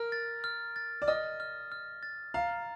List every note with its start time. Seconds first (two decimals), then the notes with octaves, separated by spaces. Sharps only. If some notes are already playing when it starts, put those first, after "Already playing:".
Already playing: A#4 F6
0.12 A6
0.44 F6
0.76 A6
1.02 D5
1.08 D#5 F6
1.40 F6
1.72 F6
2.03 A6
2.34 F5 A#5